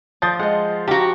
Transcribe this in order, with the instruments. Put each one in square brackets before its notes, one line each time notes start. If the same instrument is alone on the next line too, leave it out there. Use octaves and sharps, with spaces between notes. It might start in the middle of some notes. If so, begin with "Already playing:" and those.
[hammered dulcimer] F3 [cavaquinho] D5 [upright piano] D#6 G6 A6
[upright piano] G#3 [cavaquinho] D#5 F#5
[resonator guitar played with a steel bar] F#4 G4 [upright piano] F5 [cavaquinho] A5 A#5